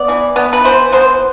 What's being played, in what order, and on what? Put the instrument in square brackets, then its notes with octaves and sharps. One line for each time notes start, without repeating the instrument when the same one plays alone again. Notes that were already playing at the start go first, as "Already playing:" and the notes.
Already playing: [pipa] B3 D5
E3
B3
B4
E3 C5
B3 C5